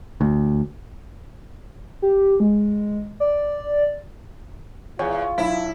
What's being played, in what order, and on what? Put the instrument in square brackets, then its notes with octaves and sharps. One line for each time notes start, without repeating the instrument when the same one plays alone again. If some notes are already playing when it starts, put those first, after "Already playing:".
[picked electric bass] D2
[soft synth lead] G4
G#3
D5
[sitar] E2 [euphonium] F4 [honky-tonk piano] G#4 C#5
[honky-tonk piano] B1 [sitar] E4